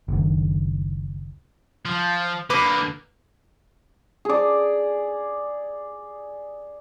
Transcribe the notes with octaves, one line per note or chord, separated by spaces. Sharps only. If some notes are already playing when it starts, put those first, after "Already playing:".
F#1 D2 D#3
F3
D3 A#3 B4 D6
G#4 D5